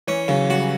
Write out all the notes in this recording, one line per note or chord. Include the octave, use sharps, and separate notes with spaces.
E3 C#4
C#3 F#3
G3 F#4